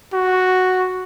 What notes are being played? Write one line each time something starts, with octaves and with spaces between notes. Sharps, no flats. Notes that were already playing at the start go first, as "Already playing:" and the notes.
F#4